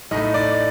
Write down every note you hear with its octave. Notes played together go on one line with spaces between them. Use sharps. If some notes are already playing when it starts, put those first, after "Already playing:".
A2 A3 D#4 D#5
D5